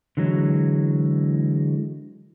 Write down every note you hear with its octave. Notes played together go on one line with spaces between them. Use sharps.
D3 E3 F#3 G#3